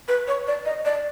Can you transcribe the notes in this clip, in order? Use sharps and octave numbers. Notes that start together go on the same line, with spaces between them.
B4
C#5
D5
D#5
D5